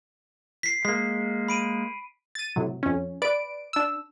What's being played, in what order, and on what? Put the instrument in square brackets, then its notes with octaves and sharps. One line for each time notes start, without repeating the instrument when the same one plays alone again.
[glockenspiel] B6 C7
[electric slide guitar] G#3 A#3 [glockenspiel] B6
[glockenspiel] B5 D7 D#7
[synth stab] A6 D#7
A2 C3 F#3
F2 C#4
B4 D5 D7
D4 E6